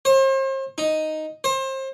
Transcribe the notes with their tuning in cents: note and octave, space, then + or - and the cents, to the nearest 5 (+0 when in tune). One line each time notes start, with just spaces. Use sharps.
C5 +40
D#4 +0
C5 +30